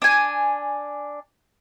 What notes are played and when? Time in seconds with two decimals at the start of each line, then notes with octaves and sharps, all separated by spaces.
0.02 D4 G#5